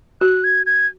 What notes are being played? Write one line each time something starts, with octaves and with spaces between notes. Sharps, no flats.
F#4 F#6
G#6
G#6